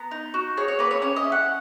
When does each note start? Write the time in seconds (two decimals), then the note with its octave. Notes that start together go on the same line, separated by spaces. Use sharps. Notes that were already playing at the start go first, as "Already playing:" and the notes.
Already playing: B3 A#5
0.11 D#4
0.34 F#4
0.57 G#4 C#5
0.68 C#5
0.79 A#3 B4
0.91 C#5
1.02 C#4 C#5
1.16 D#5
1.24 E4
1.32 F#5